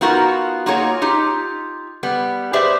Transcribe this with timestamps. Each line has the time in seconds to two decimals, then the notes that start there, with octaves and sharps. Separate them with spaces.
0.01 B3 D#4 F4 F#4 A#4
0.66 A#3 D#4 F4 F#4 G#4 C#5
1.02 D#4 F4 G4
2.03 G3 B3
2.53 G4 G#4 B4 C5 D5 E5